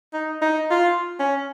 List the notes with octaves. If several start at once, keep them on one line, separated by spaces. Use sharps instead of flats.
D#4
D#4
F4
C#4